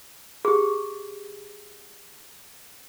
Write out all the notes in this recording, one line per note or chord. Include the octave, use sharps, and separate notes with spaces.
G4 G#4